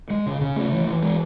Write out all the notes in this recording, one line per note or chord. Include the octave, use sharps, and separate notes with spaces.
G#3
C#3
C#3
A3
E3
E3
G#3